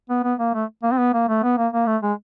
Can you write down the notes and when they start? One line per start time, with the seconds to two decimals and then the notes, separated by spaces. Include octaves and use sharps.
0.10 B3
0.24 B3
0.39 A#3
0.54 A3
0.83 A#3
0.92 C4
0.98 B3
1.14 A#3
1.28 A3
1.43 B3
1.57 A#3
1.73 A#3
1.87 A3
2.03 G#3